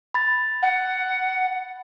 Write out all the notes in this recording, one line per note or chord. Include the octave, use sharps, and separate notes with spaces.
B5 A6
F#5